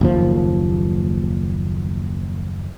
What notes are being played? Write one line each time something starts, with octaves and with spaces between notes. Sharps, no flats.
F#1 D#2 F3